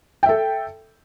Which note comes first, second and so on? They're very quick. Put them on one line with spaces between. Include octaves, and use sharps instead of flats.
G5 E5 A4